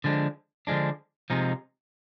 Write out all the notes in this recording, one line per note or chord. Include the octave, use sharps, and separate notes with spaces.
D3 F3 G#3 D4
D3 F3 G#3 D4
C3 F3 G#3 D#4